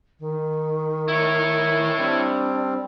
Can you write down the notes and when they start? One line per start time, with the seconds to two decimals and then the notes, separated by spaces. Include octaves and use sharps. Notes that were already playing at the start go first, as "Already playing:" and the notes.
0.20 D#3
1.08 E4 C#5
1.68 E3
1.98 G3 C4 D4